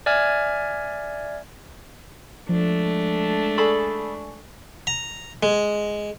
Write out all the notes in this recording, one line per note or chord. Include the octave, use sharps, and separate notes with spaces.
D5 E5 G#5 F6 G#6
F3 G#3 A3 D4
G#4 A4 D5 G#5 B5 C#6
A#5
G#3